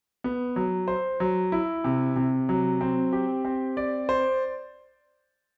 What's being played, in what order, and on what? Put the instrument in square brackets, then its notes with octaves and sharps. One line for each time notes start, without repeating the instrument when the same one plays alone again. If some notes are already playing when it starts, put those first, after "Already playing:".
[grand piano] B3
F#3
C5
F#3
E4
C3
C3
F#3
C4
G4
C4
D5
C5